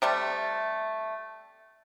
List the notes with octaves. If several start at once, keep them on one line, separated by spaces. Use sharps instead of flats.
C3 G3 A3